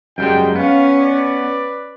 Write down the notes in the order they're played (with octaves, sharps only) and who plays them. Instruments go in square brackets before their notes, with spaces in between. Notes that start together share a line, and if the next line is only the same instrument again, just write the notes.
[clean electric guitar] F#2 G3 G#3 [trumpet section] D#4 G5
[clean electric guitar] B3 [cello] C#4 [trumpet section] F5
[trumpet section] B4 D5